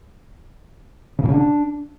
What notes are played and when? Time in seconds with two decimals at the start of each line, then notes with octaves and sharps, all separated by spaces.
1.19 C#3
1.24 A#2
1.29 C#3
1.34 D4